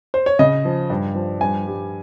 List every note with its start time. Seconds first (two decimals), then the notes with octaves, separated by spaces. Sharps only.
0.14 C5
0.26 C#5
0.39 C#3 D#5
0.65 F3
0.90 G2
1.15 F3
1.41 G2 G#5
1.67 G3